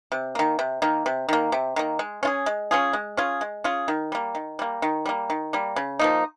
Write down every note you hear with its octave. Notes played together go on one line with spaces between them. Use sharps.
C3
D#3 A#3
C3
D#3 A#3
C3
D#3 A#3
C3
D#3 A#3
G#3
C#4 F4 G#4
G#3
C#4 F4 G#4
G#3
C#4 F4 G#4
G#3
C#4 F4 G#4
D#3
G3 A#3
D#3
G3 A#3
D#3
G3 A#3
D#3
G3 A#3
C#3
F3 A#3 D#4